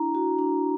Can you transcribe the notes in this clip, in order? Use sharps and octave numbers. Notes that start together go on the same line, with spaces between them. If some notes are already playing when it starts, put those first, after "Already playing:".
Already playing: D4 E4 A#5
F#4
D4